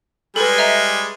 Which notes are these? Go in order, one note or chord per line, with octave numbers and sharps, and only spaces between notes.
G3 G#3 G#4 A4 B4
D#5 E5 A#5